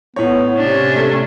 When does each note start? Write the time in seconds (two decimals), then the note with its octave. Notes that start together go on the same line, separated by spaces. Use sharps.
0.16 A2 B3 C#5
0.57 C3 C#4 D4
0.96 A3